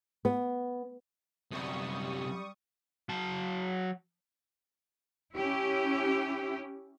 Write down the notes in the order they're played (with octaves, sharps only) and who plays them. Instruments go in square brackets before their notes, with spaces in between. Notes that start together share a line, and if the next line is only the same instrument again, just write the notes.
[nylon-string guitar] B3
[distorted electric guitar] F#2 C3 [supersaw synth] G3 C#6 D#6
[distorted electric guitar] F#3 A5
[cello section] C#4 E4 G4